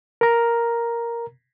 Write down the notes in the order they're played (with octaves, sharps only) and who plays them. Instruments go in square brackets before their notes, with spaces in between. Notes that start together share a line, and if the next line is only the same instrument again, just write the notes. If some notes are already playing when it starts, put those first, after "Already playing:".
[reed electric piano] A#4 A#5